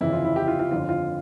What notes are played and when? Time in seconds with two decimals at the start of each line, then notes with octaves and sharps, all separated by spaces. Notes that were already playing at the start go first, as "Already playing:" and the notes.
0.01 G1 F2 C#3 E3 E4
0.12 F4
0.25 E4
0.36 G4
0.48 F4
0.59 F4
0.71 G1 F2 D3 F4
0.89 F4